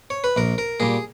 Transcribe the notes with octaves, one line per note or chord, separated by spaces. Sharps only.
C#5
B4
A#1 A#4
A#4
A#2 G3 G#4